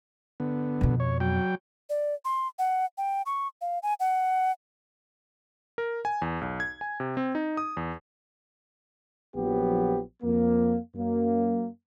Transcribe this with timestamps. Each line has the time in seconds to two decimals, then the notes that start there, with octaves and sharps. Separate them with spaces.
0.40 D3 B3
0.81 F2 B2
1.00 C#5
1.20 F#3 G5
1.90 D5
2.25 C6
2.59 F#5
2.98 G5
3.26 C#6
3.61 F5
3.83 G#5
4.00 F#5
5.78 A#4
6.05 G#5
6.22 E2
6.41 B1
6.60 G#6
6.81 G#5
7.00 C3
7.17 C4
7.35 D#4
7.57 D#6
7.77 E2
9.35 A#1 F3 F#3 B3 G4
10.23 F2 A#3
10.95 F#2 A#3